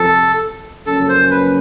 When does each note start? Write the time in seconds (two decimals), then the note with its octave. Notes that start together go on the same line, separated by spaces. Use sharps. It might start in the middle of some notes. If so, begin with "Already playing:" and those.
Already playing: F2 C3 F3 A4
0.87 F#2 C#3 F3 A#3 C#4 A4
1.09 C5
1.31 B4